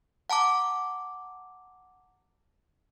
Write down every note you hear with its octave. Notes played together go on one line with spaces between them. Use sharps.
F#5 A5 A#5 D6